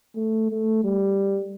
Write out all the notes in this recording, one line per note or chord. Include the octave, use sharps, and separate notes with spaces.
A3
A3
G3